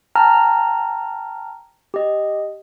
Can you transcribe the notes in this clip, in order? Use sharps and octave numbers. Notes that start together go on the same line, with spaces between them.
G5 A5 A#5 F6
G4 D#5